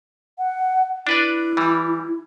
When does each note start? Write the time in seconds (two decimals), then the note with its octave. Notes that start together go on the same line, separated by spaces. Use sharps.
0.38 F#5
1.07 D4 E4 B4 D5
1.57 E3 G3